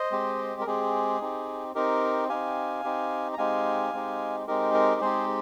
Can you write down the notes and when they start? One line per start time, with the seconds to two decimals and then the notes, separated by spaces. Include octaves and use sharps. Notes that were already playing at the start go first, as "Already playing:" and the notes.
Already playing: C5 D#5
0.11 G#3 C4 G4
0.61 A#4
0.66 G#3 C4 G4 G#4
1.21 C4 D#4 G4
1.75 C4 D#4 G4 A#4
2.29 C4 D#4 G4 F5 G#5
2.84 C4 D#4 G4
3.34 A#5
3.38 G#3 C4 D#4 G4 F5 G#5
3.93 G#3 C4 D#4 G4
4.47 G#3 C4 D#4 G4 A#4
4.74 A#4
5.01 G#3 C4 D#4 G4 G#4 C5